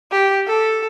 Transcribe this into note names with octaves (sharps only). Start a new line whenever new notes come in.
G4
A4